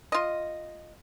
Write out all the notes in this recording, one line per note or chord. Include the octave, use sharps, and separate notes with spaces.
F4 D#5